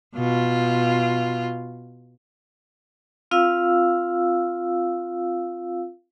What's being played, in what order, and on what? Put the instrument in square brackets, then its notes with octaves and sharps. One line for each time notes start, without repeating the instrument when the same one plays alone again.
[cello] B2 F4
[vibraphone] C4 F4 F5 E6